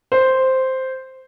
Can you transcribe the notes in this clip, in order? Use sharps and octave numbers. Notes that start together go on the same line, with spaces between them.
C5